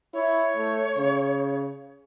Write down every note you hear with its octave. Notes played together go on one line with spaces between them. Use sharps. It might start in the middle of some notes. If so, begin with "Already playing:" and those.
E4 C#5
A3
C#3